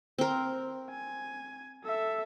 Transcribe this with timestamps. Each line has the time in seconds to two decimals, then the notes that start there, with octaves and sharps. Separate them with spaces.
0.18 C4 A#4
0.91 G#5
1.84 A4 E5